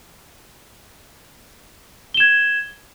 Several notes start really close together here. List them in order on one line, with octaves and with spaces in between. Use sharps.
G7 E7 G#6